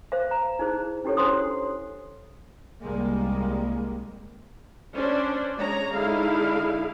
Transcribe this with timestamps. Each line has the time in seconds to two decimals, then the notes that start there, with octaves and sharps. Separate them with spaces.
0.12 C5 F5
0.31 A#5
0.59 D#4 E4 G#4 C5
1.04 C#4 E4 G4 A4 C#5
1.17 D4 C5 C6 D#6
1.39 F#5
2.81 C2 G3 G#3 A#3
4.94 C#4 D4 C5 D5
5.57 G#3 G#4 C#5 A#5
5.93 D3 G#3 D#4 E4 G#4 F5